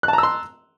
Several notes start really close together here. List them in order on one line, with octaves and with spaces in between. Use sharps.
F#6 A5 A#5 E6 C6